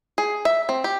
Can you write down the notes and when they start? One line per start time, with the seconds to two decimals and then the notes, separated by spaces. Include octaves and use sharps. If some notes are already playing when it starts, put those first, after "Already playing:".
0.18 G#4
0.45 E5
0.69 C4
0.84 G4